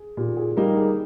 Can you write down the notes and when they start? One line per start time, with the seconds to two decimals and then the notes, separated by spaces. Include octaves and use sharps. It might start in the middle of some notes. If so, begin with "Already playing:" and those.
Already playing: G#4
0.17 A#2 G4
0.37 G#4
0.57 G3 A#3 D#4 G4
0.76 G#4